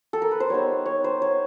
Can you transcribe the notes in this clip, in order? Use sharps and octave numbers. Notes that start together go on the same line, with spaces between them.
A4
A#4
B4
C5
G3 B3 D#4 C#5
C#5
C5
C#5